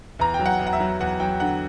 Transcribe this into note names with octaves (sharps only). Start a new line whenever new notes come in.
E2 A#5
G5
F#3
F#5
E2
F#5
E5
F#3
E2 F#5
F#3 G5
D3 F#5